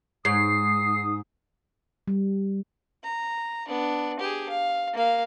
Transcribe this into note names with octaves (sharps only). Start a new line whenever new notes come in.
G#2 D#6 C7
G3
A#5
B3 D4
G4 G#4
F5
A#3 F5